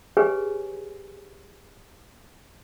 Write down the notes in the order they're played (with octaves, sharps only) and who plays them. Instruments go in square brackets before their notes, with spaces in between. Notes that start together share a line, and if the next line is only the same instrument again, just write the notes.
[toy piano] G4 G#4 B4 C#5 G#5